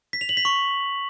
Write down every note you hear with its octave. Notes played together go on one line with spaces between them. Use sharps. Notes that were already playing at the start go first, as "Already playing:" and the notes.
B6
F7
F#7
B6
C#6